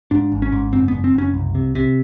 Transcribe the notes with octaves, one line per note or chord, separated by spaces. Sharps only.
G#2 D4
G#1
C#4
G#2
F#1 C4
F#1 B3
C4
F#1 C#4
C2
C3
C3